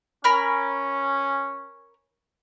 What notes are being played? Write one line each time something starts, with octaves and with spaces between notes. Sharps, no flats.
C#4 A#4 B5 F6